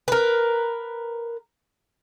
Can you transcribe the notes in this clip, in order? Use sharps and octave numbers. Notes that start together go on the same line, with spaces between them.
A#4 B4